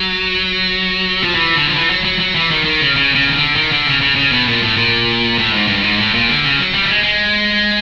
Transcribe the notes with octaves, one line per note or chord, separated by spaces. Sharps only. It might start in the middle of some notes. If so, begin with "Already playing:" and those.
Already playing: F#3
F3
E3
D3
F3
E3
F#3
F#3
F#3
E3
D#3
D#3
C#3
C#3
C#3
D#3
D3
D#3
D3
C#3
C#3
C#3
B2
A#2
A2
A#2
A2
G#2
G2
G#2
A2
A#2
D3
C#3
F#3
G3
A3
G#3
G#3